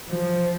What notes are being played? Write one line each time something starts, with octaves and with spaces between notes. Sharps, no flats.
F3